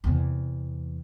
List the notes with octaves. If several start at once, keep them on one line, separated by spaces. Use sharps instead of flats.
E2 C3